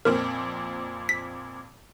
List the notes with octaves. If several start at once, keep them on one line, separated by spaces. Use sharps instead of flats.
F2 A#2 C4 A#4
B6